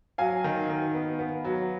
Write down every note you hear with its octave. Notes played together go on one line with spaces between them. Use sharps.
F#3 F5 G#5
D#3
D#3
B3
B3
F#3